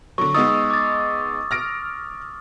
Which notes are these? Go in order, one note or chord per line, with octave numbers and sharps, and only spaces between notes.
D3 F#3 C#6
G#3 B3 D#4 D#6 E6 A6
D6 A6
F6 A#6 D7